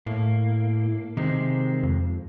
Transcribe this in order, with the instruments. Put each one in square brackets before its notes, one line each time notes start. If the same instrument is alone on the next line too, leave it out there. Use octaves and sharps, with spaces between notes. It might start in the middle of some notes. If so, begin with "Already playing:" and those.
[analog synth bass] A2 [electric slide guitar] A#3
[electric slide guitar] C3 G#3 C4 [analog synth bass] D#3
[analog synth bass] F2